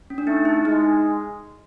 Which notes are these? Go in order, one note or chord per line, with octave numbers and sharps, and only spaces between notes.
C#4
D4
A3 D#4
E4
G#3 D#4